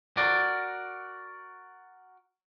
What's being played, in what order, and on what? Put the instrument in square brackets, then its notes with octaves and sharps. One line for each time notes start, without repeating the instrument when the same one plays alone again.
[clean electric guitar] F#4 A#4 D5